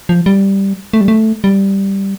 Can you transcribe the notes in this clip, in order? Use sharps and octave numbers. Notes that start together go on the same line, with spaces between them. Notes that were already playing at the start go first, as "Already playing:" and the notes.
F3
G3
A3
G3
A3
G3